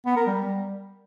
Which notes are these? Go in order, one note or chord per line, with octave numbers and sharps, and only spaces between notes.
B3
A#4
G3